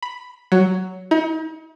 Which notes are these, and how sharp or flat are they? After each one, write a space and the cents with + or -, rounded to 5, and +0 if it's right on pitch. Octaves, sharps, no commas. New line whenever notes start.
B5 +5
F#3 +10
D#4 +45